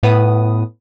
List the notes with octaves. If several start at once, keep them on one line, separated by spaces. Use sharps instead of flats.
A2 B3 B4 D#6